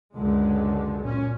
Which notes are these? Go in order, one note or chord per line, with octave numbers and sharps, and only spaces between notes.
C#2 F#2 D3 G#3
A#2 C#4